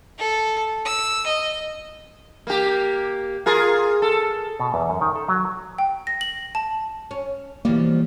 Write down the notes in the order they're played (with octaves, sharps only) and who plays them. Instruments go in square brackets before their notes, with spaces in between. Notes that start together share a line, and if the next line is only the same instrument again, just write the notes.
[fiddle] A4
E6
D#5
[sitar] A#3 G4
F4 G#4 A#4
A4
[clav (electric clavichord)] B2
E2
F#2
D#3
A4
F#3
[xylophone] G5
A#6
F#7
A5
[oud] C#4
[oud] B2 F3 G3 [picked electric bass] E3 A#3